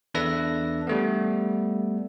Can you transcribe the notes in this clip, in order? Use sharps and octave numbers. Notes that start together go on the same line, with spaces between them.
E2 D4 A4 B4 E5 A#6
G3 A3 B3